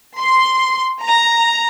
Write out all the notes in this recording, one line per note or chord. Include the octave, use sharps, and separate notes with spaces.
C6
A#5